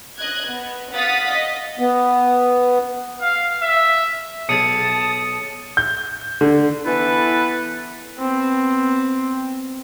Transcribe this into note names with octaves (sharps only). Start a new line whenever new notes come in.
D#5 F#6 G#6
B3
F5 F#5 D#6 A6 B6
D#5
B3
F5
E5
B1 G#4 A5 D#6 C#7
G6
D3
E3 B3 E4 A4 B4
B3 C4